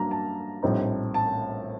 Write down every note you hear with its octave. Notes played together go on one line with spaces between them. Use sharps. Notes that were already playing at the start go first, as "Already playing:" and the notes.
Already playing: G2 F#3 A#3 D4 A#5
A5
A#1 A2 G3 C4 D#4
A5